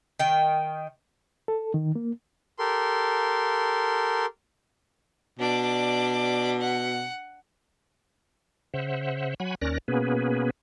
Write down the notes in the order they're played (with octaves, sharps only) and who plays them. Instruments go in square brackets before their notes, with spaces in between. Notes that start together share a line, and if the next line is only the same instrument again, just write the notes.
[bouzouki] D#3 G5
[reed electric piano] A4
D#3
A#3
[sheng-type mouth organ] G4 A4 A#4 C6
[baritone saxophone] B2 [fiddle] D4 D5
[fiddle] F#5
[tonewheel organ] C#3 C5 E5 F#5
F#3 F#5 G#5 B5
D#2 C#4 A#4 D5 F#6 A#6
B2 A#3 B3 C#4 G#4 B4